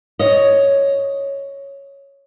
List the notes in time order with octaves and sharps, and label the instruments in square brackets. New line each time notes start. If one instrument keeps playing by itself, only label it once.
[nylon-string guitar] C#5 D#5